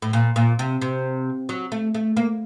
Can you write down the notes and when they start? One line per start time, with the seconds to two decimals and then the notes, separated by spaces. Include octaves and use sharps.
0.02 A2
0.13 A#2
0.36 A#2
0.59 C3
0.82 C3
1.49 F#3
1.72 A3
1.94 A3
2.17 A#3